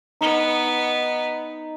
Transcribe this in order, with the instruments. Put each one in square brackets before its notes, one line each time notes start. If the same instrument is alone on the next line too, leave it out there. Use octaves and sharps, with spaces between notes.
[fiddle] B3 [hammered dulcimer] D#4